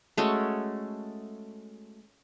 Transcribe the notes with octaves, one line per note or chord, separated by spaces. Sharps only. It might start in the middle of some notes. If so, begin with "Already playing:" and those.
G#3 A3 C#4 F#4